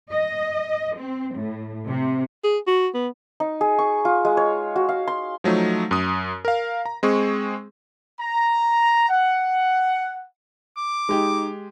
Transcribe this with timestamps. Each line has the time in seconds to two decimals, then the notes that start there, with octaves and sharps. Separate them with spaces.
0.11 D#5
0.98 C4
1.36 A2
1.88 C3
2.44 G#4
2.67 F#4
2.94 B3
3.40 D#4
3.61 G#4
3.78 C#6
4.05 F4
4.25 G#3
4.37 C#5
4.76 F#4
4.89 F5
5.08 C6
5.44 F3 F#3 A3 D#4
5.91 F#2 D#6
6.45 A#4 F5
6.86 A#5
7.03 G#3 C4 G#4 C#6
8.20 A#5
9.10 F#5
10.77 D6
11.09 G#3 D#4 G4